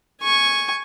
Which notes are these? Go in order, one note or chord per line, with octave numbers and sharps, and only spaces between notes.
G#5 C#6